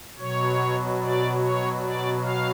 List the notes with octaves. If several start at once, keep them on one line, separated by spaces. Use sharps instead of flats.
B2 F#3 C#5
D5
C#5
D5
F5